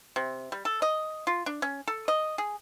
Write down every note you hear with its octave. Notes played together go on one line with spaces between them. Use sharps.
C3
G3
A4
D#5
F4
D4
C#4
A4
D#5
G#4